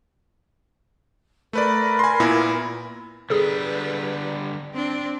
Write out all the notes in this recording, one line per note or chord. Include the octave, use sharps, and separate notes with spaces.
A3 A#4 B4 D5 B5
G#5 C6
A#2 B3 E4
D3 G3 G#4 A4 B4
C4 D4